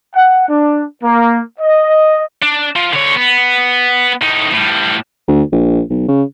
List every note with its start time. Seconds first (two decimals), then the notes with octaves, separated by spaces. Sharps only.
0.14 F#5
0.49 D4
1.03 A#3
1.59 D#5
2.42 D4
2.76 F3
2.93 D3 C#5
3.16 B3
4.22 A2 D#4
4.53 A2 G3
5.28 D2
5.52 A#1
5.90 B1
6.08 C#3